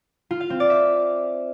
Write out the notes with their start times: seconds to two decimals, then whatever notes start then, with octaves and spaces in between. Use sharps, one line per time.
0.31 F4
0.40 F5
0.50 C4
0.60 D5
0.70 E5